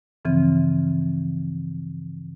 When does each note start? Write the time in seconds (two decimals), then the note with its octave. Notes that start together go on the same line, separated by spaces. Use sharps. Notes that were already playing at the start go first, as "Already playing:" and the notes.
0.25 G2 C#3 E3 F3 C4